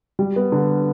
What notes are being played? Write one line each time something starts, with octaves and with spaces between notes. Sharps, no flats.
G3
B3
D3